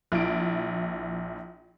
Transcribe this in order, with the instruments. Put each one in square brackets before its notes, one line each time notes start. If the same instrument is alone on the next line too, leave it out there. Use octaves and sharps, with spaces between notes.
[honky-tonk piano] A#1 E4 D7